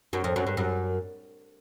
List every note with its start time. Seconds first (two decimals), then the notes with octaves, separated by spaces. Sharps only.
0.13 F#2
0.24 F2
0.36 F#2
0.47 G2
0.57 F#2